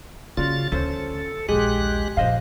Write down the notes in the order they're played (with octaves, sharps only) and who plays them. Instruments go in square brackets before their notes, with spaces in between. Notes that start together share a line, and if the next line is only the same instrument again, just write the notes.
[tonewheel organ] C#3 F4 A6 [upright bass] A#3 C#4 [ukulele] F#4 D5
[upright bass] D2 [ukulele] C#4 C5 [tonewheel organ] A4
[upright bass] A#1 D#2 [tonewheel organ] G#3 G4 F#6 [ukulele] G#4
[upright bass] A#1 G2 [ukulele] C5 D#5 F5